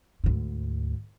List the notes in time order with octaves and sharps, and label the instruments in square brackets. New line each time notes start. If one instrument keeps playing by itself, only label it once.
[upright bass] D2 G#2